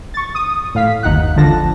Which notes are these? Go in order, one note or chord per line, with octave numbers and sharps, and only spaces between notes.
C#6 A6
D#6
A2 F5 B6
G1 D#2 D#4 F#5 F#6
G#1 D3 F3 A5 A#6